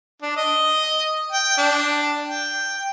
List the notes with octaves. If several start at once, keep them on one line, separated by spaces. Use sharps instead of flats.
D4
D#5
G5
D4
G5